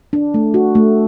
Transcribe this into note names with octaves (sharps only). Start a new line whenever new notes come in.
D4
A3
F#4
A3